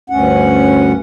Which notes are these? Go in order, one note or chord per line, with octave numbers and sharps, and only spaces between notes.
D2 G2 C#4 F#5